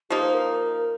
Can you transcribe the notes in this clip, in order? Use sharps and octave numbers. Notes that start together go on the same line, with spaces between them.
F3 A#3 D#4 G4
C5
A#4